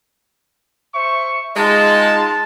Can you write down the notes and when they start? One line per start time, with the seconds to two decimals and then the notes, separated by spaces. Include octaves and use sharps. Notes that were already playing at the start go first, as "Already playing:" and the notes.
0.93 C5 E5 C#6
1.56 G#3 D#4 F4 A5